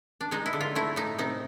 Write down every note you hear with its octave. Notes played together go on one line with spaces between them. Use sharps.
D4
G#3 D#4
E4
D3
F4
A3 E4
A2 D#4
C3 D#4